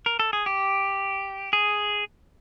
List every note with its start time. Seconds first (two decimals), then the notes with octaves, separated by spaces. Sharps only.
0.06 A#4
0.20 A4
0.33 G#4
0.46 G4
1.53 G#4